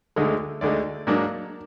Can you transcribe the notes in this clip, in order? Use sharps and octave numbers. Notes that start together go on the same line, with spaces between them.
D2 D3 G#3 D#4
D2 D3 G#3 D#4 D5
G#2 F#3 A#3 D4